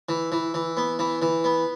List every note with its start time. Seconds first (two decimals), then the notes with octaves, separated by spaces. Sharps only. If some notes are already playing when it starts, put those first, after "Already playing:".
0.09 E3
0.32 E3
0.54 E3
0.77 B3
0.99 E3
1.22 E3
1.44 B3